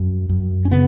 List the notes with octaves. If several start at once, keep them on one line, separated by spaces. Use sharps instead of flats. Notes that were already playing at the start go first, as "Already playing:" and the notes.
Already playing: F#2
F#2
C#4
C#3 B3